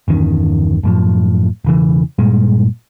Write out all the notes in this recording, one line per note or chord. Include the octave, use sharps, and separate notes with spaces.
G1 E2 D#3 C#4
F#2 A2 F3
E1 C#3 E3
G2 A#2 G3 G#3